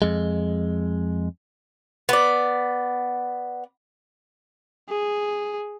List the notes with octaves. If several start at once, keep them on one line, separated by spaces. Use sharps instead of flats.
F2 G#3
B3 D5
G#4